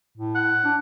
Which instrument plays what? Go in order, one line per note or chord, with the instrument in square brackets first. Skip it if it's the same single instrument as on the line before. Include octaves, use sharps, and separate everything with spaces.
[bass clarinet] A2
[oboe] F#5
[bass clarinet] D4